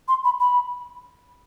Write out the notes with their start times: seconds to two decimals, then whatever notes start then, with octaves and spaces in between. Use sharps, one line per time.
0.08 C6
0.25 B5
0.40 B5